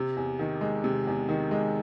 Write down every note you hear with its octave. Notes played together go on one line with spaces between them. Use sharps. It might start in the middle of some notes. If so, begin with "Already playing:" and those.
Already playing: C3
E2
D#3
G#3
C3
E2
D#3
G#3